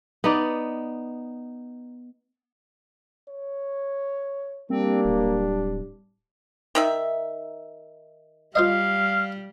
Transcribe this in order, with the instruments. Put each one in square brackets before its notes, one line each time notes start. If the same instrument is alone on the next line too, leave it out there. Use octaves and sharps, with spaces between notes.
[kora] B3 D#4 D5
[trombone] C#5
[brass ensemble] G3 D4 [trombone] A#3 [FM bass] C4
[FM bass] D1
[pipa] D#3 D#4 E5
[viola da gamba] G3 [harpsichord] F4 C5 D#5 [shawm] F5